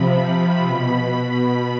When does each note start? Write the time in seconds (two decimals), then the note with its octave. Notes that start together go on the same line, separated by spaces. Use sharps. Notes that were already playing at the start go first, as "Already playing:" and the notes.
Already playing: C3 F3 B5
0.21 B5
0.66 B2